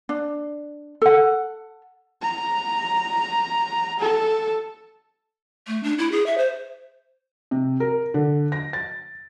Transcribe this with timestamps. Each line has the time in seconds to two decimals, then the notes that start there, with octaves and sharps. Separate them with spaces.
0.09 D4
1.02 A4 F#5
2.22 A#5
4.00 A4
5.68 A3
5.84 D4
5.98 E4
6.12 G#4
6.26 E5
6.38 C5
7.51 C3
7.80 A#4
8.14 D3
8.52 A#6
8.73 A6